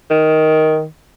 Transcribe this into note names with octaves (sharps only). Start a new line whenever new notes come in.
D#3